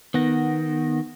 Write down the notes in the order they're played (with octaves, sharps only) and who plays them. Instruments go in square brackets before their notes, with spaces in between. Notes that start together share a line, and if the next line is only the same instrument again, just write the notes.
[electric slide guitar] D#3 [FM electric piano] B3 F#5 A#6